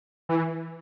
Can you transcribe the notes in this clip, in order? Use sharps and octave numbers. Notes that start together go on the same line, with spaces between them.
E3